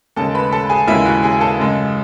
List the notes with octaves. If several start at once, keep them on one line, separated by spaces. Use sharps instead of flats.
D#2 C#3 G#3 A4 A5
B4 B5
A4 A5
G#4 G#5
D#2 C#3 G#3 E4 E5
F#4 F#5
G#4 G#5
A4 A5
F#2 C#3 G#3